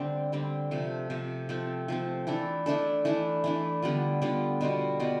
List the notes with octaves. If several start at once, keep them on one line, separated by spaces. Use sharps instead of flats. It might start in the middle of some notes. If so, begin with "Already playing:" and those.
Already playing: D3 G3 A3 C4 D4 G4
D3 G3 C4
C3 F3 A3
C3 F3 A3
F3 A3 C4
F3 A3 C4
E3 A3 D4 A4
E3 A3 D4 A4
E3 A3 D4
E3 A3 D4
D3 G3 B3 F4
D3 G3 B3 F4
B2 G3 B3 F4
B2 G3 B3 F4